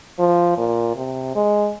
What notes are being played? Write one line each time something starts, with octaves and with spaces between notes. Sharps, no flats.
F3
A#2
C3
G#3